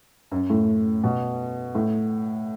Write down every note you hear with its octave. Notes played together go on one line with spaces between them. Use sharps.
F#2
A2
B2
A2